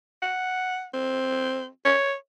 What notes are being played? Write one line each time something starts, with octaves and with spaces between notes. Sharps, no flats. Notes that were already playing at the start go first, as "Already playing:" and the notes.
F#5
C4
C#5